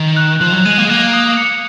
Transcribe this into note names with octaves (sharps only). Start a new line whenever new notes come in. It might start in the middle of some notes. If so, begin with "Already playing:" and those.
Already playing: D#3
F#6
F3 F#6
F#3
G#3 D#7
A#3
G#3
A#3 F#6
D#6
C#7